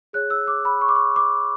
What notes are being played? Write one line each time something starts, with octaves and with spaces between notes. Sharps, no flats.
G#4 C#5 F#6
E6
D6
B5
C#6
D6
C#6
D6